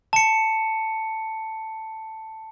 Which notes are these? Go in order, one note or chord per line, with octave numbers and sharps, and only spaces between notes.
A5 C#7